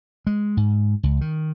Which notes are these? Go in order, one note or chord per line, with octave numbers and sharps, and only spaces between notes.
G#3
G#2
C#2
D#3